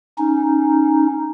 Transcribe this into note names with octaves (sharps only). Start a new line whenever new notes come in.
C#4 D#4